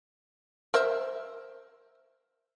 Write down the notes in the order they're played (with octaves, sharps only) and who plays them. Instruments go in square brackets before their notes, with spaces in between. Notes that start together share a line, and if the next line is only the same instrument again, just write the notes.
[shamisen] A#4 C5 E5